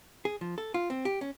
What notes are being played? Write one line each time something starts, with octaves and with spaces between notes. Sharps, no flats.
G#4
F3
A4
F4
C4
G4
C#4